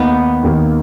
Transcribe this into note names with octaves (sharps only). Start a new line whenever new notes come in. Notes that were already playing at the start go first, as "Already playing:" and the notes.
Already playing: D#2 D#3 A#3 B3 D#4
D#2 D#3 A#3